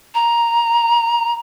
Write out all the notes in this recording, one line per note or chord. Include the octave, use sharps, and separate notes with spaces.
A#5